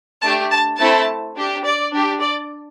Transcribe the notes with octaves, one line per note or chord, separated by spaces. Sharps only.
A3 D4 G4 A5
A5
A3 C4 E4 A4 A5
D4 G4
D5
D4 G4
D5